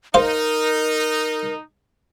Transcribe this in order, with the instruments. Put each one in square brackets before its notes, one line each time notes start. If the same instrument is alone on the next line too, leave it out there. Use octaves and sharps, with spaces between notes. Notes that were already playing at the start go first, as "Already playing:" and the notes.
[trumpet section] D#4 [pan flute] A#4 [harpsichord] C5 F5